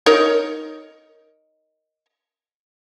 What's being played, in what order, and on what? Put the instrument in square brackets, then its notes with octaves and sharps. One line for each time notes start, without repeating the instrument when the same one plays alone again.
[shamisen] D#4 A#4 C#5